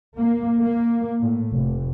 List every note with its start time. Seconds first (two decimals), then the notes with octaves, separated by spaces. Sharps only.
0.18 A#3
0.61 A#3
1.20 A2
1.54 F1